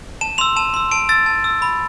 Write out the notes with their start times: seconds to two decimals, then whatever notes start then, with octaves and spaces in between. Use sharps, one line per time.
0.21 A5 E7
0.38 C6 E6 F7
0.56 A5 E7
0.74 C6 E6
0.92 A5 D7
1.09 E6 A6
1.26 A5
1.44 E6
1.62 B5